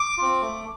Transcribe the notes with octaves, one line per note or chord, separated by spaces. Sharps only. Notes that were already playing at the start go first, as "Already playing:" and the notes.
Already playing: D6
C4 F4
A3